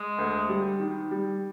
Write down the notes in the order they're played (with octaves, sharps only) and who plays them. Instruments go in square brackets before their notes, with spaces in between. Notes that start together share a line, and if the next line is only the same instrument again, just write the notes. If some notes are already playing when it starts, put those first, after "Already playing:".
Already playing: [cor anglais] G#3
[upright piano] D2
G3
D#3
G3